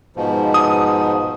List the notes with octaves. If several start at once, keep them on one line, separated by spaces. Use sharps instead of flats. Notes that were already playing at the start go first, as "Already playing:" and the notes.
G#2 B2 F3
D#6